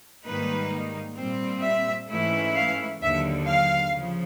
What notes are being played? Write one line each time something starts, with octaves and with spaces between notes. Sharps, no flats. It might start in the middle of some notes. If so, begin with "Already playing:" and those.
G#2 D#3 G3 A#3 D#4 B4
A#2 G3 C4
E5
G#2 E3 A3 C#4 E4
F5
D#2 D3 F#3 E5
F5
C#3 F3